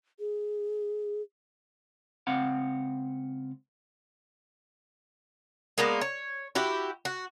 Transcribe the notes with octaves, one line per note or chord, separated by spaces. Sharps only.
G#4
C#2 C4 F5 F#5
G#3 A#3 B3 D5
C#5
E4 F#4 G4
F#4